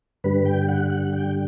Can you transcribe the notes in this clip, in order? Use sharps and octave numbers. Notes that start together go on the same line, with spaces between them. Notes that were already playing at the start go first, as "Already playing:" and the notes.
G2 D3 G3 B4
G5
F#5
F#5
G5